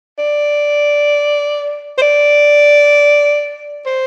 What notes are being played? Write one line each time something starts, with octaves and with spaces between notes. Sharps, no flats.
D5
C5
D5
C5